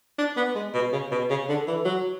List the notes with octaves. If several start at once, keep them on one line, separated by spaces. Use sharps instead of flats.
D4
B3
G#3
B2
C#3
B2
C#3
D3
E3
F#3